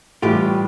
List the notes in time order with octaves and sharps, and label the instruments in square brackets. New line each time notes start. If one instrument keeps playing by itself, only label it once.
[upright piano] A2 E3 G3 [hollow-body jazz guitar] F4 G4